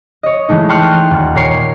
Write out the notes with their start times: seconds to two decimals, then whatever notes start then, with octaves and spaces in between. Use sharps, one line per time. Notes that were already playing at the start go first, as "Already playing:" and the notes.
0.23 C#5 D#5
0.49 E3 G#3 A3 D#4
0.69 G5 A5 C6 C#6 F6 F#6
1.11 D#1
1.35 A#2 A#4 C#5 C7 D7